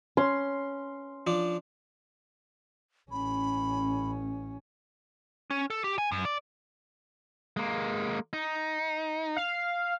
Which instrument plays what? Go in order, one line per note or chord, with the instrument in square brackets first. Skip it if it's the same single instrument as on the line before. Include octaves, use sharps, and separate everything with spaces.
[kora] C#4 [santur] C6
[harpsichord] F3 D4
[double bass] A1 C#4 [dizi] B5
[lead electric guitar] C#4
A4
G4
G#5
F#2
D5
G#3 A#3
D#4
[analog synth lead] F5